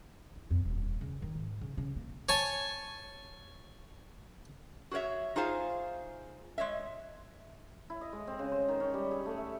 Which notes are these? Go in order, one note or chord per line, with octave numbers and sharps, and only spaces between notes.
E4
F2
D#1
C#3
D#3
G#2
C#3
C#3
A#3
C#5 G#5 A5
F#4 G#4 B4 C#5 E5
D#4 F4 G#4 C5 F5
G#3 C#5 D#5 E5
E4
D#5
G#3
C4
C#3
C5
D#3
C#4
G3
G#4
A3
E5